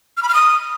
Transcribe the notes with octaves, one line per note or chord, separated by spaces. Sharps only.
F6
B5
F6
D#6